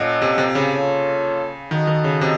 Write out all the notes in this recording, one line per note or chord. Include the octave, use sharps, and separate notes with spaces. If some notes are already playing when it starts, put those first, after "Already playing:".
Already playing: A#2 C#4 A4 D#5 F#5
C3
C3
C#3
A#3 F4 A4 C#5
D#3 F#4 A4 D#5
D#3
C#3
C3